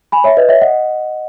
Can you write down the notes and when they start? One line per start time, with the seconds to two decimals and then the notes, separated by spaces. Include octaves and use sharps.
0.12 G#5 B5
0.24 C#5 E5
0.37 B4 D#5
0.49 C#5 E5
0.62 D#5 F#5